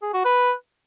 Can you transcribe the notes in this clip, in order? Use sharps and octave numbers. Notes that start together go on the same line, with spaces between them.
G#4
F#4
B4